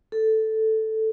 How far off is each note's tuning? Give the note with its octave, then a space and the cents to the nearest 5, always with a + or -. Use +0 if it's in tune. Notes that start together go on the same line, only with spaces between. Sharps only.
A4 +0